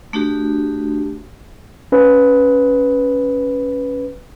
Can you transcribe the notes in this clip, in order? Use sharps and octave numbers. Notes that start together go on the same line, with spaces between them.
A3 D4 F#4 G4
C#4 B4